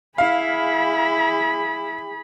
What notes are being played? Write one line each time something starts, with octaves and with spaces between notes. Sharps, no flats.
E4 G#4 F5 B5